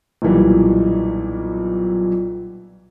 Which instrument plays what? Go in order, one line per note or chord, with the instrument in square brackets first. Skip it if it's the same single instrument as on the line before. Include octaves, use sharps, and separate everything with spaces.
[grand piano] B1 A#2 E3 G3